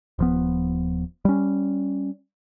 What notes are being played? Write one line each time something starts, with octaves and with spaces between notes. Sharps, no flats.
D#1 F3 B3
G3 C#4